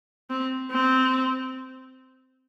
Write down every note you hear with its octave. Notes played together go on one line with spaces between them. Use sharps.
C4
C4